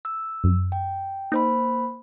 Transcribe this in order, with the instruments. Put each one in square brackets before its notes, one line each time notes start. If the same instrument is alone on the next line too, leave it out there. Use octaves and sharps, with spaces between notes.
[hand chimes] E6
[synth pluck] F#2
[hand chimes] G5
[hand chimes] A#3 C5 B5 [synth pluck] D#4